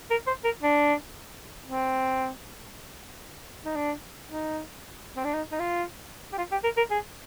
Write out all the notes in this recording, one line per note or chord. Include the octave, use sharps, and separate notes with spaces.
A#4
C5
A#4
D4
C4
D#4
D4
D#4
C4
D4
D#4
D#4
F4
G4
F4
G4
A#4
A#4
G#4